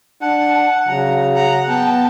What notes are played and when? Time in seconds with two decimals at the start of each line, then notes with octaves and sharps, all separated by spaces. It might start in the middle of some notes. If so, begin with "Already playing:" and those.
0.22 D4 F#5 A5
0.88 C#3 F#3 A#5
1.35 F#5 A#5 F#6
1.69 B3 G5 A5